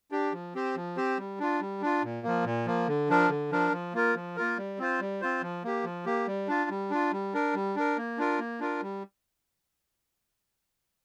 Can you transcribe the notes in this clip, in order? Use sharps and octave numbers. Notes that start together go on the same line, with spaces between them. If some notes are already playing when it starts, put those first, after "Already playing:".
D4 G4
F3
C4 G4 C5
F3
C4 G4 C5
G3
D4 F4
G3
D4 F4
A#2
F3 A#3
A#2
F3 A#3
D3
F3 D4 A#4
D3
F3 D4 A#4
F3
A#3 F4 A#4
F3
A#3 F4 A#4
G3
C4 F4 C5
G3
C4 F4 C5
F3
A#3 G4
F3
A#3 G4
G3
D4 F4
G3
D4 F4
G3
D4 A#4
G3
D4 A#4
A#3
D4 F4 A#4
A#3
D4 F4 A#4
G3